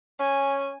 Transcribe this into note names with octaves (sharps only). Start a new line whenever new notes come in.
C#4 G#5